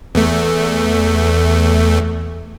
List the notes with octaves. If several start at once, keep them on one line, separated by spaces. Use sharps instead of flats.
E2 A3